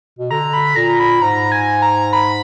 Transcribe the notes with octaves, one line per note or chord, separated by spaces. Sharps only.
B2
D3 A#5
B5
A#2 A#5
B5
G#2 A#5
G#5
A#5
B5